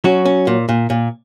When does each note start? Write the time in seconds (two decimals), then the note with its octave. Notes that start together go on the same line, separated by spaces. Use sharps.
0.04 F#3 C#4 F#4
0.25 C#4
0.47 A#2
0.69 A#2
0.90 A#2